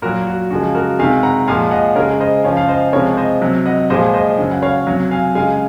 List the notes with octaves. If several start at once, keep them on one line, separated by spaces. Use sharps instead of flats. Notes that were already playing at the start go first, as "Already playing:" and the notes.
A#2 F#3 F#4 A#4
F#4
C#3 F3 G#3 F#4
F#4 A#4
C3 D#3 G#3 F5 G#5
F#5 A#5
A#2 F3 G#3 F5 G#5
D#5 F#5
C#3 G#3 A#4 C#5
C5 D#5
C#3 F3 G#3 C#5 F5
F5
C5 D#5
C3 F3 G#3 A#4 C#5
C5 D#5
C3 F#3
D#5 F#5
A#2 F3 G#3 C5 D#5
C5 D#5
C#3 F#3
F#5
C#5 F5
C3 F#3
F5 G#5
C#3 G#3 F5 G#5